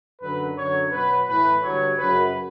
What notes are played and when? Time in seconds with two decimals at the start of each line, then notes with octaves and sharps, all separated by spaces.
0.22 F#2 D3 F#3 B4
0.57 F#2 D3 F#3 C#5
0.92 B2 F#3 B4
1.28 A2 E3 B4
1.63 G2 D3 F#3 C#5
1.98 F#2 C#3 F#3 B4